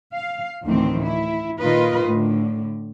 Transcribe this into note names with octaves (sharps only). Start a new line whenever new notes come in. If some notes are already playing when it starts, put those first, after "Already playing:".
F5
D2 A2 D#3 E3 C4
E4
A#2 D#3 F4 A#4 B4 D#5
A2 D3